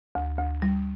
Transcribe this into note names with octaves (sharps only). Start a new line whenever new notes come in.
D2
D2
G3